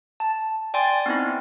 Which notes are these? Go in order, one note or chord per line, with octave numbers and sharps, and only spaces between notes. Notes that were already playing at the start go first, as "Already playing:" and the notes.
A5
D5 G5 G#5 C6 A6
B3 C4 D#4 E4